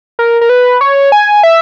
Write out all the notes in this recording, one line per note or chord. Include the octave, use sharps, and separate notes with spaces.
A#4
A#4
B4
C#5
G#5
E5